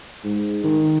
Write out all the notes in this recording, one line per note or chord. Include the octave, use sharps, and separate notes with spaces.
G#2
D#3